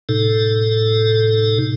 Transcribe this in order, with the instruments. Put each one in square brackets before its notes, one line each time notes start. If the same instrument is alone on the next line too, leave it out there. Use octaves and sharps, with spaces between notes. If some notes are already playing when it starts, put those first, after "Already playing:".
[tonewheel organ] A2 C3 D#4 A4